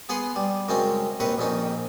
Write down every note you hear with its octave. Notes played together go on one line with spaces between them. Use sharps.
B3 G#4 F#5 C6 D#6
G3
F#2 C#3 G#3 C4 C#4
D#2 C4 B4 C#6 D#6
A#1 F2 C#4 D#4